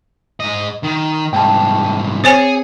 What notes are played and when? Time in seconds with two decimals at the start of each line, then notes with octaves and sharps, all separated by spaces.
0.40 G#2 D#5
0.83 D#3
1.33 C2 G#2 G5 A5
2.24 C4 G#4 C5 C#5 G#5 C#7